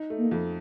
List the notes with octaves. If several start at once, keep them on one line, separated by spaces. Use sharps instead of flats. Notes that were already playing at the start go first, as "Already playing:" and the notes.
Already playing: D#4
A3
A#3
F2